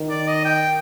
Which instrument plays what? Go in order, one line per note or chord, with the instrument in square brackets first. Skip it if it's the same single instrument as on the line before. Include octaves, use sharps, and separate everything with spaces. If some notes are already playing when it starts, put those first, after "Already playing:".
Already playing: [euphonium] D#3
[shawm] D5
D#5
G5